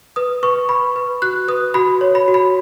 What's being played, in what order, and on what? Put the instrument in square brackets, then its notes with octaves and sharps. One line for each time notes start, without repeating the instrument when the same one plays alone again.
[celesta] B4 D#6
B4 C#6
B4 B5
B4
F#4 F#6
B4 D#6
F#4 B5
C#5
B5
F#4
B5